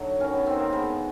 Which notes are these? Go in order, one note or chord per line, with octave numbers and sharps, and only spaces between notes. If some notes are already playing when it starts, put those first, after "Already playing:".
Already playing: D3 F#3 A3 D#4
D#3 C#4
B3
D#3 C4
A#3
G#3 B3